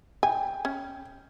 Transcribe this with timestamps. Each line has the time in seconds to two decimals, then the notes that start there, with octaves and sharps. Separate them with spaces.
0.23 G5 G#5
0.65 C#4